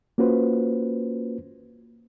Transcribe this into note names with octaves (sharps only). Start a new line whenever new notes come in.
A#3 C#4 F4 F#4 B4 C5